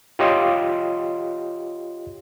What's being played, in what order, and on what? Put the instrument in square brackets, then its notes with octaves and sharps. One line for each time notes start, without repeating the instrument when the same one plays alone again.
[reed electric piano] F4 G4 C#5 D#5 C6 D6